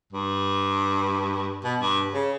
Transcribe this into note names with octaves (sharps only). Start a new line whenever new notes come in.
G2
B2
G2
C#3